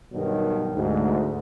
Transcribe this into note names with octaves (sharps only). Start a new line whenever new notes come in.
G2 B2 D#3 F#3
D2 G#2